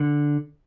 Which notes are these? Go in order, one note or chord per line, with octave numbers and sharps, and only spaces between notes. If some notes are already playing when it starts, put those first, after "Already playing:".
Already playing: D3